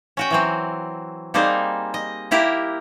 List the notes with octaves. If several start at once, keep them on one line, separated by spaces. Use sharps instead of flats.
C#4 F#4 G5
E3 F#3 C4
G3 A#3 C4 D#4 G#4 C5
D#5
A#3 E4 G4 A#4